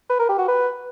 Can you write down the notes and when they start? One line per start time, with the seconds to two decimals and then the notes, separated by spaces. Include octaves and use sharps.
0.10 B4
0.19 A#4
0.29 G4
0.38 F#4
0.48 B4